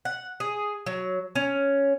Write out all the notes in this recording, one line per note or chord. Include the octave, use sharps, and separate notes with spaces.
F#5
G#4
F#3
C#4